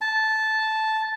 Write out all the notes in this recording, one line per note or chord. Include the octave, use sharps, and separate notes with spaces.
A5